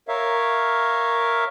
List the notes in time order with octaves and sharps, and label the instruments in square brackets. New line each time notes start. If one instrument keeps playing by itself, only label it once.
[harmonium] A#4 C#5 E5 F5